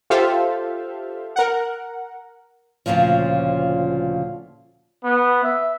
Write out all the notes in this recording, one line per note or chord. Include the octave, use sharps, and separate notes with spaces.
F4 G4 A4 C5 E5 F5
A#4 F#5
D2 G2 A#2 C#3 F3
B3
E5